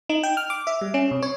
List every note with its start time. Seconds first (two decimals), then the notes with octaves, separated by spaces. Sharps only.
0.09 D#4
0.23 G5
0.37 F6
0.50 D6
0.67 E5
0.81 G3
0.94 C#4
1.11 C3
1.22 C#5